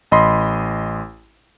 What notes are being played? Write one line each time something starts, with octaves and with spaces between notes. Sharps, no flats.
A1 D#5 B5 C6